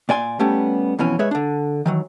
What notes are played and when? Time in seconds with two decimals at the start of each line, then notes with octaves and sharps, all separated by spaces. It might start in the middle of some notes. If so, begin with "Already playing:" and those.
0.09 A#2 D5 G#5 C6
0.39 G3 A3 B3 C#4 G4
0.99 F2 B2 E3 C#4
1.19 G#3 G#4 B4 C#5 E5
1.31 D3 D4
1.86 D#3 E3 F#3